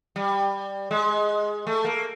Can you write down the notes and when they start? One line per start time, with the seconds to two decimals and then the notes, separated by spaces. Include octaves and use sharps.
0.16 G3
0.91 G#3
1.67 A3
1.85 A#3